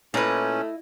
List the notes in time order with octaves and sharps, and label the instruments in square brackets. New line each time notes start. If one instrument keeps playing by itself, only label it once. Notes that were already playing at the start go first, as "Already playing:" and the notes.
[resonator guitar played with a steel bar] A#2 B4 [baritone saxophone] A3 [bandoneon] C#4 [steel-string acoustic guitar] E4 D#5